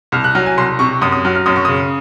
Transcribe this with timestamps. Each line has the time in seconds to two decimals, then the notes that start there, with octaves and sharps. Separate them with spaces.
0.12 C2 F6
0.24 F#6
0.35 F#3 F6
0.46 G#5
0.57 C2 C6
0.79 C3 C#6
1.02 F#2 D#6
1.12 D#6
1.25 F#3 F6
1.35 F6
1.46 F#2 D#6
1.56 C#6
1.65 C#3 D#6